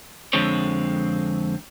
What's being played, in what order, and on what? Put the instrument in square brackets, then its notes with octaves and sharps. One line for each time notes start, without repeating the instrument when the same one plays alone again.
[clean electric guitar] F2 D3 G#3 C4 C#5